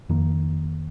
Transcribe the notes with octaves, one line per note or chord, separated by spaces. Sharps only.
F2 D#3 A#3